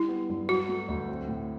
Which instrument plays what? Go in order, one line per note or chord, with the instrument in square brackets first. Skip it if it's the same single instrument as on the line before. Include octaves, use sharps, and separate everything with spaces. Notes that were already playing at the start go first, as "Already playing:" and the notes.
Already playing: [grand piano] G3 [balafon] E4
[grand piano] B3
G2
[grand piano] F#3 [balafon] F#4
[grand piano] A3
D2
C4
A2